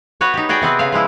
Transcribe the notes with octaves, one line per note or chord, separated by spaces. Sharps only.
B3 F#4 B4 C#5
D#4 G4
F#4 G#4 D5 D#5 G5
C3 B3 C4 B4
C#3 B4 F5
F3 G#3 E4